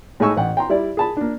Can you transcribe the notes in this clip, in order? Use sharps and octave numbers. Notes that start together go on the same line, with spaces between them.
A2 G#3 D#4 G#5 C#6 E6
A1 F#5 G5
G5 A#5 C6
G3 E4 D5
G#4 A5 B5
A#3 D4